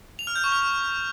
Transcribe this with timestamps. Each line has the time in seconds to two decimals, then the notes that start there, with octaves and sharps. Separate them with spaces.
0.19 F7
0.27 F6
0.35 G6
0.44 C#6
0.52 F6